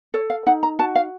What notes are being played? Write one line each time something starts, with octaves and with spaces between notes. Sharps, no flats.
A4 C#5
F5
D#4 F#5
A#5
F#4 A5
F5